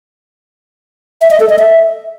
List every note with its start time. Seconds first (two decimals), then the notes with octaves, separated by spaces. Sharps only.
1.21 E5
1.31 D#5
1.40 A4
1.49 D#5
1.59 E5